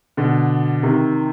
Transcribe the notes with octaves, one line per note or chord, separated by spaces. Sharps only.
B2 D3
C3 D#3